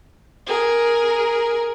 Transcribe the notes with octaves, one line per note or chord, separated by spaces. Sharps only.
G#4 A#4